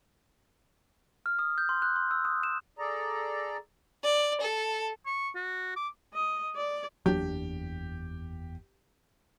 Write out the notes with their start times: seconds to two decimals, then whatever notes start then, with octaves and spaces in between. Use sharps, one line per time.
1.26 F6
1.39 D#6
1.58 G6
1.69 C6
1.82 F#6
1.96 C6
2.11 E6
2.25 D#6
2.43 E7
2.79 G#4 A4 D5 A#5
4.04 D5
4.41 A4
5.06 C#6
5.35 F#4
5.76 D6
6.14 D#5
6.56 D5
7.06 F#1 E2 F#3 A#3 D4 G4